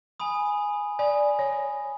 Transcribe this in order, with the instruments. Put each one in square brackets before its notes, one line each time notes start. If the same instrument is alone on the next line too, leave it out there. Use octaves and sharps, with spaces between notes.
[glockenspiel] G#5 B5 D#6
[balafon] D5 [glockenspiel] G#5 B5 D#6
[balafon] C#5